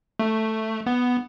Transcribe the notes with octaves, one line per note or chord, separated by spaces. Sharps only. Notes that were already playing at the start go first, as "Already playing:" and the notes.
A3
B3